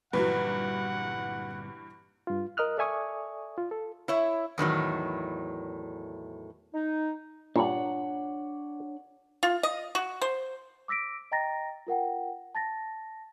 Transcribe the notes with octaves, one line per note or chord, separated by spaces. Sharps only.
G1 G2 A#2 E3 F#3 G3 B4 F#5
G2 F4
A#4 D#5 D#6 F6 F#6
A4 D5 E5 G#5 C#6 D#6
F4
A4
E4 C#5 E5
E2 A2 D#3 F#3
D#4
G2 A#2 D4 C#5 F#5
F4
D#5
F#4
C5
D6 E6 A#6 B6 D7
D#5 G5 A#5 A6 A#6
F4 A#4 F#5 G5
A5 A6 A#6